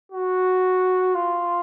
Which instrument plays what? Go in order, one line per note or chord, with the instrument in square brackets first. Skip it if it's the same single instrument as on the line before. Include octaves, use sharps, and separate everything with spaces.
[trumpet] F#4
F4